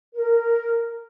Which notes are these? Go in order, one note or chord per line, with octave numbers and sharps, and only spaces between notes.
A#4